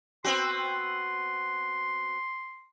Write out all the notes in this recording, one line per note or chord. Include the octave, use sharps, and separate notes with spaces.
B3 C4 F#4 C6